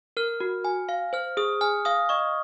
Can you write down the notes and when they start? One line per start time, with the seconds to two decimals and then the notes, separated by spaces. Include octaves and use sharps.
0.17 A#4 F6
0.40 F#4
0.65 G#5
0.89 F5
1.13 C5 F6
1.37 G#4 D#6
1.61 G#5 F6
1.85 F5 D#6
2.09 D#5 C#6